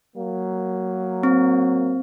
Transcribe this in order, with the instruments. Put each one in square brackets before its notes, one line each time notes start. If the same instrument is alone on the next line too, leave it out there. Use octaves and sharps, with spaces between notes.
[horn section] F#3 A#3
[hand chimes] C4